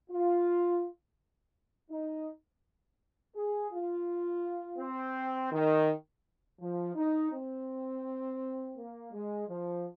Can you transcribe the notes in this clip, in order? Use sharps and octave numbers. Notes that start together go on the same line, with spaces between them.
F4
D#4
G#4
F4
C4
D#3
F3
D#4
C4
A#3
G#3
F3